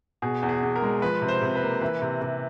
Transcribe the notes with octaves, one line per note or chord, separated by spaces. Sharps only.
B2 G#4
E2
G#4
E2
A#4
G#3
F3 B4
C3
C5
C3
B4
A#3
E3 B4
C3
C3